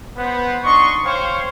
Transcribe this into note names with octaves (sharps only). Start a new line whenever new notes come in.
B3 B4 C5
D4 D#4 D#5 C6 C#6
C5 C#5 F5 G5 C6 C#6